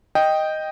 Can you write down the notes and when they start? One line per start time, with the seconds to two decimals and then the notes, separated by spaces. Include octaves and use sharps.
0.15 D#5 G5